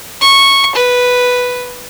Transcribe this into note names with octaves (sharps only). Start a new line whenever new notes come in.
C#6
B4